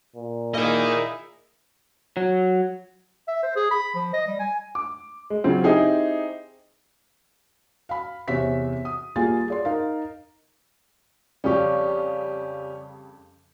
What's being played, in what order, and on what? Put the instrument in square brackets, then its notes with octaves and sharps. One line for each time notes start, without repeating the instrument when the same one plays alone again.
[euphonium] A#2
[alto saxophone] A#3 [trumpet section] D#4 E4 G#4 [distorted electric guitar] A#4 D#5
[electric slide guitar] F#3
[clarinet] E5
C5
G#4
B5
F3
D#5
G3
G#5
[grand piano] D6
G#3
C#3 F#3 C4 F4 G#4
C4 D#4 E4 G4 G#4
[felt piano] F5 B5
E2 C3 C5 C#5 E5 B6
D#6
G3 A#3 F4 G#4 G#5 A6
G#4 D5 C6
D#4 A#4 F5
[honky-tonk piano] F2 C#3 G3 [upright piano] C#4 G4 [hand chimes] D5 F5 C#6